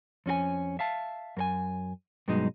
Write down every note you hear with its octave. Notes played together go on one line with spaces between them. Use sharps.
F2 C#4 F#4 G#5
E5 F5 A5
F#2 A#4 G#5
G2 B2 F#3 G#3 D#4